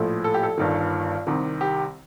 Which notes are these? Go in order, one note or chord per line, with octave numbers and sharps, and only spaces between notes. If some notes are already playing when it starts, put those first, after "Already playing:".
Already playing: A#1 A2 F3 A3
A4
G4
A4
G1 G2 D#3
C2 C3 D#3
G4